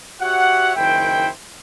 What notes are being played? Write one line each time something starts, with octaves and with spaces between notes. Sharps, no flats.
F#4 G4 C#5 E5 F#5
F#1 D#3 E4 C5 G5